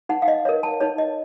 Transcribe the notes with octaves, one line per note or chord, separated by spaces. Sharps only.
D#4 F#5
F5
D#5
A#4 C#5
A5
D#4 C#5
D#5